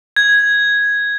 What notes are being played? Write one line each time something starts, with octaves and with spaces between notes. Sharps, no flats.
G#6